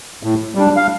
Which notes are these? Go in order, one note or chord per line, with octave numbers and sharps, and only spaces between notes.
A2
G3 D4
F5